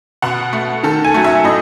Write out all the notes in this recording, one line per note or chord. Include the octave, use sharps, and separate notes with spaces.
B2 F#5
A3
D#3 A4
G#5
F#3 A3
E5
A2 D#5